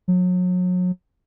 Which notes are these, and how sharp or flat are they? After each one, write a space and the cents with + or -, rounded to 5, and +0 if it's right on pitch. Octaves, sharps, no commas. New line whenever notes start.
F#3 -35